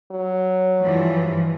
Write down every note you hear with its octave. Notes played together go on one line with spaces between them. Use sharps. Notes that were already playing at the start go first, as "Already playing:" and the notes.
F#3
G2 E3 F3